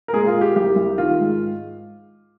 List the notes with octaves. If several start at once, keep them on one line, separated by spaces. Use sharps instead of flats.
A#4
A#2 G#3 G#4
F4
G#3
G4
C2 G4
C2
D#3 F4
G#2